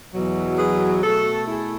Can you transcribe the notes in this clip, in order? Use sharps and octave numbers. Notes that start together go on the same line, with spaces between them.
E2 B2 F#3
G#4 B4
B2 A3 F#4 A4
E4 G#4